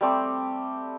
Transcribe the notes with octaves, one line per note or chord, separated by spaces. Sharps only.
G3 A3 C4 G4